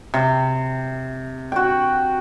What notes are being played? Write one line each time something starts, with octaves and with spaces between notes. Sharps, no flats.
C3
F#4 G5